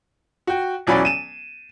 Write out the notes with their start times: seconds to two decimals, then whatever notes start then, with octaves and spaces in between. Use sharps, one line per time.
0.47 F#4 G5
0.87 E1 E3 F#3 C#4 D5 B5
1.05 D#7 E7